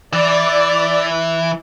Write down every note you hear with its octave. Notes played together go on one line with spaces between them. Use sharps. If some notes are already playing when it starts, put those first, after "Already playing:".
E3 D5